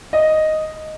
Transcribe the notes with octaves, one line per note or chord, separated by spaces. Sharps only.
D#5